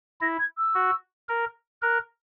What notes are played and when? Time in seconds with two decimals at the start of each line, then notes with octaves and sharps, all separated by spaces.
0.21 E4 A#6
0.39 G#6
0.57 E6
0.75 F#4
1.29 A#4
1.82 A#4 F#6